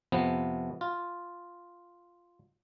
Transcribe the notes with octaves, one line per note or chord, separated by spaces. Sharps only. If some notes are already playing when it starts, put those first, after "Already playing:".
F2 C3 F3 B3
F4